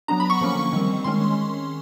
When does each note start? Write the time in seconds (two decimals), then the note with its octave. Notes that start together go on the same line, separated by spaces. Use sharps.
0.08 F#3 B3 D4 A#5
0.20 B5
0.30 C#6
0.41 D3 F3 A#3 C#4
0.72 D#3 G3 C4
1.04 D#3 G#3 C#4 C6